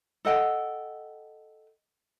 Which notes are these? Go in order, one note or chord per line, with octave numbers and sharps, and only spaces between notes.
A4 D#5 F#5 G5